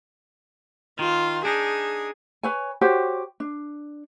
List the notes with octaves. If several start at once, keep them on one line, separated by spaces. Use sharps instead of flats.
D#3 F4
D4 D#4 G#4
B4 C#5 G#5
F#4 G4 C5 C#5
D4